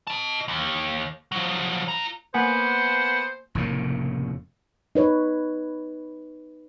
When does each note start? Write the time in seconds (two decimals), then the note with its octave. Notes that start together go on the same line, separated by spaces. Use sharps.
0.07 D#5 A5
0.48 D#2
1.32 F3 F#3
1.88 F4 A#5
2.34 A#3 B3 C5 F#5 G#5
3.55 F1 A2 C#3 A#3
4.95 D#4 B4 C#5